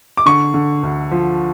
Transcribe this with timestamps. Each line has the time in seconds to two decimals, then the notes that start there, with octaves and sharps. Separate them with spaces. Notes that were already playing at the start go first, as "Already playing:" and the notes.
0.17 D6
0.26 D3 C#6
0.54 D3
0.83 D2
1.11 F3